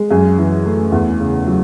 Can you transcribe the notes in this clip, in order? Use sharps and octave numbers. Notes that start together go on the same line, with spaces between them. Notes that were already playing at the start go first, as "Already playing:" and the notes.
Already playing: G#3
F#2 G#4 G#5
E3
A3
E2
C#3
F#3